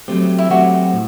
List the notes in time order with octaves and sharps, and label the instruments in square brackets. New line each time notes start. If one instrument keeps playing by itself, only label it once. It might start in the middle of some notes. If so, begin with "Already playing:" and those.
[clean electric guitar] F#3 A3 C4 G4
[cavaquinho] E4
[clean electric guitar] F#3 A3 C4 G4 [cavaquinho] F#4
[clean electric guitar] A2